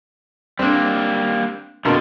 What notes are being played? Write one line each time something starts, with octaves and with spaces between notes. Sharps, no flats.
G3 A#3 C4 D4
F2 B2 D3 A#3